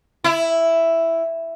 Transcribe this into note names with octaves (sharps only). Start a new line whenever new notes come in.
E4